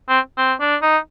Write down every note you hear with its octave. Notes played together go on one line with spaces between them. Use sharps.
C4
C4
D4
D#4